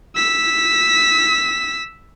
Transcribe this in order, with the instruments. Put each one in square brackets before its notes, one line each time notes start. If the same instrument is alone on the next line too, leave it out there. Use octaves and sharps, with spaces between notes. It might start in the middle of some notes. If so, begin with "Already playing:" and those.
[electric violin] E6 B6